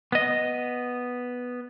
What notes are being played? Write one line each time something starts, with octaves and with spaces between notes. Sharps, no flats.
B3 D#5